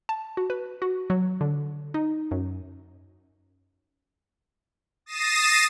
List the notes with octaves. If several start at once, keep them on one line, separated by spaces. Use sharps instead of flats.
A5
F#4
B4
F#4
F#3
D3
D#4
F#2
D#6 A6 A#6 C7 D#7 E7